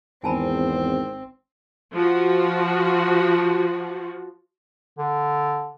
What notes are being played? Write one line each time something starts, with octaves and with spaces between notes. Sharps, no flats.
G#1 E2 C4 G#5 A5 B5
F3 F#4
D3